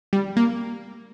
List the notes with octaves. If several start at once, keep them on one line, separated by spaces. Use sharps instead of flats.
G3
A#3